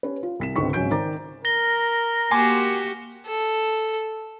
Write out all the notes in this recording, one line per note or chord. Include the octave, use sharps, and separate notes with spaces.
C#4 G4 B4
F4
C2 B6 E7
C#2 G#2 D3 C4 C#6 B6
G#1 C#3 F#3 G#5 G6 D7
D#3 C5 D5 A#5 D6 A6
A#4 A#6 G7
A#3 F#4 G4 G#5 C6 D6
A4